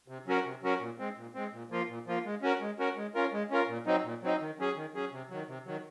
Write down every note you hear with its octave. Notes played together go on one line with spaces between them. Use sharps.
C3
F#3 C#4 F#4 A#4
C3
F#3 C#4 F#4 A#4
A#2
G#3 C4
A#2
G#3 C4
A#2
F3 A#3 F4
A#2
F3 A#3 F4
G#3
C#4 F#4 A#4
G#3
C#4 F#4 A#4
G#3
C#4 F4 A#4
G#3
C#4 F4 A#4
A#2
F#3 C4 D#4
A#2
F#3 C4 D#4
D#3
F#3 C#4 G#4
D#3
F#3 C#4 G#4
C3
D#3 F#3
C3
D#3 F#3